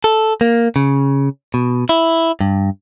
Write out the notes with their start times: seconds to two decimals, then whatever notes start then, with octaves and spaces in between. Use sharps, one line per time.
0.04 A4
0.41 A#3
0.76 C#3
1.54 B2
1.89 E4
2.41 G2